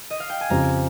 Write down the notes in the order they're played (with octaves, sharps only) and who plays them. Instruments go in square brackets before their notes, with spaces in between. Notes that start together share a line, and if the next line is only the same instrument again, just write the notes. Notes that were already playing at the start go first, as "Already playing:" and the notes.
[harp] D#5
F5
G5
G#5
[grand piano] F2 C#3 F3 C4 G4 [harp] A#5